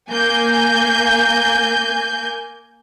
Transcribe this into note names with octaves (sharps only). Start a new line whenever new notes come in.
A#3 G#5 G6